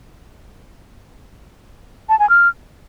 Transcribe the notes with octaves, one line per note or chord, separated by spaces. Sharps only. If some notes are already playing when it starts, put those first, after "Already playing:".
A5
G#5
F6